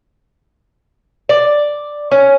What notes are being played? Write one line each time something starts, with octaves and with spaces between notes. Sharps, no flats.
D5
C#4